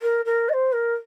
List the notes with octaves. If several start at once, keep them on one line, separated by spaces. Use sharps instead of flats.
A#4
A#4
D#5
C5
A#4